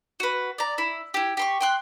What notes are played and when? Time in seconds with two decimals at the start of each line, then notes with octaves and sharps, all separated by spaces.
0.20 F#4 B4
0.58 D5 A#5
0.78 E4
1.14 E4 G4
1.37 G4 C6 C#6
1.61 G5 C6 F#6